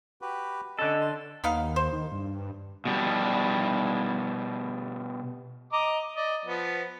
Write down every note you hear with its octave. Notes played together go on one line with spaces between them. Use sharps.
F#4 G4 B4
D3 C#4 A4 D#5
C6
D#2 B3 D#4 F5
C5
D#3
G2
B2 G3
D#5 A#5 D6
D5 D#5
F3 B3